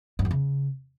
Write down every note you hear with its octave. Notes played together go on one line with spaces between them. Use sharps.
G2
F2
C#3